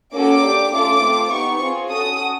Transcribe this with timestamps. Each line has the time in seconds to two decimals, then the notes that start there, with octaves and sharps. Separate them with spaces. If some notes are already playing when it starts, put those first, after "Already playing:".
0.14 A#3 C#4 F#4 A4 D6
0.44 D4 G4
0.73 A3 C#4 F4 A4 D6
1.03 A3 C4 F4
1.32 B3 D#4 G4 C#6
1.61 C4 F4 G#4
1.91 C#4 F#4 A4 D#6